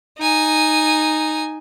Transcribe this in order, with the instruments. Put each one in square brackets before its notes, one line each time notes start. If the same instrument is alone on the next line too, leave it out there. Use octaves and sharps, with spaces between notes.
[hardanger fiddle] D#4 G#5